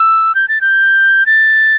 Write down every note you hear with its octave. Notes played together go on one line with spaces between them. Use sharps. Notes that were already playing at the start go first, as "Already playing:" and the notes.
Already playing: E6
G6
A6
G6
A6